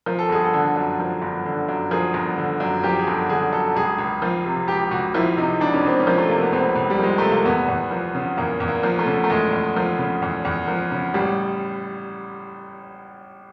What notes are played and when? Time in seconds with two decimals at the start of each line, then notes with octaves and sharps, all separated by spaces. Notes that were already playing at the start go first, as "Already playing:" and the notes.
0.06 F3
0.19 A4
0.29 G1 G#4
0.44 A4
0.53 D3
0.76 F#2
1.00 F3
1.22 G1
1.46 D3
1.68 F#2
1.91 F3 G#4
2.14 G1
2.37 D3
2.60 F#2
2.83 F3 G4
3.00 G#4
3.06 G1 A4
3.29 D3 G#4
3.53 F#2 A4
3.75 C#2 G#4
3.98 C#2
4.22 F3
4.46 C3
4.68 C#2 G4
4.91 C#2 F#4
5.14 F3 E4
5.37 C3 D#4
5.61 C#2 D4
5.74 C#4
5.83 C#2 C4
6.00 C#4
6.07 F3
6.18 A3
6.29 C3 A#3
6.41 B3
6.52 C#2 C4
6.76 C#2
6.90 G3
7.00 F3 G#3
7.18 C3 A3
7.32 A#3
7.45 E2 B3
7.68 E2
7.91 F3
8.15 C#3
8.37 E2 A#3
8.60 E2
8.68 A#3
8.83 F3
8.99 A3
9.06 C#3
9.24 A3
9.30 E2 G#3
9.53 E2
9.76 F3
9.98 C#3
10.22 E2
10.45 E2
10.68 F3
10.91 C#3
11.14 A1 G3